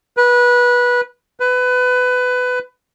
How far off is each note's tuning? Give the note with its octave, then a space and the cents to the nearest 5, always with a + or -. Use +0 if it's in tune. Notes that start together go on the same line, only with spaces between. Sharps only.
B4 -20
B4 +20